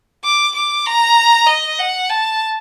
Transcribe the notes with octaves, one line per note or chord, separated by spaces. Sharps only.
D6
D6
A#5
D#5
F#5
A5